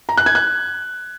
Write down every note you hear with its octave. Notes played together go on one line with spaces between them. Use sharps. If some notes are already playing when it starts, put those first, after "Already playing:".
A#5
F#6
G#6
F#6